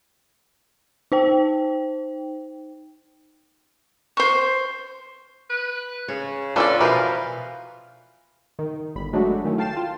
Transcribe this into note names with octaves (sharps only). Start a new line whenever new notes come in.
D#4 C5 G5
C5 C#6
B4
C#3 C#5
C#4 D4 F4 A4 B4 D5
B2 E3 F3 A#4 B4 F5
D#3
G1 B5
F#3 G#3 A3 D4 F#4
D#3 A3 C#4 E4
F5 G5 A5 A6 C7 E7
F4